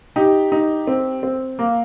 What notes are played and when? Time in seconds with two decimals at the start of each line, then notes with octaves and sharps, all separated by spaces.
0.16 D#4 G4
0.52 D#4
0.87 C4
1.23 C4
1.59 A#3